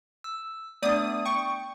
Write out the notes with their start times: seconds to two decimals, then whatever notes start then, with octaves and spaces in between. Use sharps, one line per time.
0.24 E6
0.82 A3 B3 D4 D5 D#6
1.25 G5 C#6